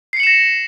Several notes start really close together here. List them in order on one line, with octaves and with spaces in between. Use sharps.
C7 C#7 F#7 E7 A#6